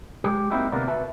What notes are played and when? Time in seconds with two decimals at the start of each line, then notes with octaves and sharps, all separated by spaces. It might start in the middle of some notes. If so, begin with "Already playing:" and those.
0.24 G#3 G4
0.51 A#3 C4 D#4 E4 F#4 G4
0.72 D2 C3 A#3 B3 A#4 D5
0.88 F#4 B4 E5 A5